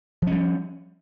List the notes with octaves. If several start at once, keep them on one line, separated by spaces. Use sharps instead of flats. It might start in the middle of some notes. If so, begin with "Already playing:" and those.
F3 G3 C#4